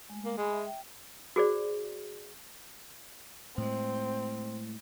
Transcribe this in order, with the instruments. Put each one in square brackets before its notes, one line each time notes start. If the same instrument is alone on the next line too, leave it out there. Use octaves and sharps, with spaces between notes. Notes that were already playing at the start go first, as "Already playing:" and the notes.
[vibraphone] G#3 A3
[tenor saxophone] A#3
[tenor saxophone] G#3 [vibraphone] G#5 B5
[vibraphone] E5
G5
[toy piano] F#4 G#4 C5 D5
[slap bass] A2 G#3 [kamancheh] C4